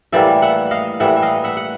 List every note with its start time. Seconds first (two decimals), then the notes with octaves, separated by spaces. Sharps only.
0.12 A2 E3 G3 A#3 D5 E5
0.42 E5 F#5
0.71 D#5 F5
1.00 A2 E3 G3 A#3 E5 F#5
1.16 E5
1.22 D#5 F5
1.44 E5 F#5
1.57 F#5